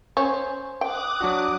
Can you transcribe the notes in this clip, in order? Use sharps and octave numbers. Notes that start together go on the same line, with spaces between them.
C#4 C5
G5 D6 D#6 F#6
F#3 D4 F#4